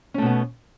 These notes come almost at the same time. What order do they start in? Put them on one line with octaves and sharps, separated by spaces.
C#4 A3 B2 B3